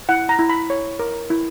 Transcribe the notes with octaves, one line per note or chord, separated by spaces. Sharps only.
E4 F#5
A#5
E4
B5
C#5
A#4
E4